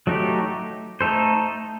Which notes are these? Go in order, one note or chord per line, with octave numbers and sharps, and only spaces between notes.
F#3 A3 D#4 G4
A3 D#4 A4 C5